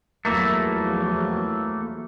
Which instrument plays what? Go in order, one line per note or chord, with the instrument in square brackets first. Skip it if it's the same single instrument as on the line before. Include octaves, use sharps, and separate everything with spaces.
[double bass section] E2 F3 F#3 [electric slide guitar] A3 A#3 E4